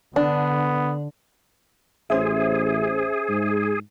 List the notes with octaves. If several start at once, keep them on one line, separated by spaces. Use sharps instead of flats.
D3 B3 D4
A1 C#4 G#4 C5 E5
G#2